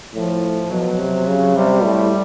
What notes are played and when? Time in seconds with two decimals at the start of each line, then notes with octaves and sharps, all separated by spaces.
0.15 A2 F3
0.71 B2 F#3
0.81 F3
0.90 F#3
0.99 C3
1.27 C#3
1.56 C3 G3
1.84 A2